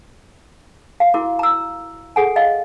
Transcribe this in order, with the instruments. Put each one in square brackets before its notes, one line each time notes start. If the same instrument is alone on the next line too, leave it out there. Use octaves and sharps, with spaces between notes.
[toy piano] F5
E4 F#4 A#4 D6
A#5 E6
G#4 A4 F#5 G#5
D#5 F5